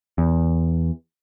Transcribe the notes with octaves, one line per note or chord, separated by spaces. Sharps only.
E2